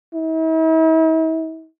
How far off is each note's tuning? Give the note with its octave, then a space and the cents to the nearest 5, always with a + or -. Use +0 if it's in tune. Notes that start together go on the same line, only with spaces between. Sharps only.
E4 -45